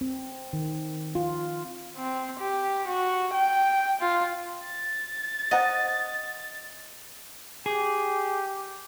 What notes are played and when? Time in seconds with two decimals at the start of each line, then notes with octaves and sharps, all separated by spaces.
0.01 C4
0.53 D#3
1.15 F4
1.96 C4
2.40 G4
2.88 F#4
3.34 G5
4.01 F4
4.65 A6
5.51 C4 D#5 F#5 A#5
7.66 G4 G#4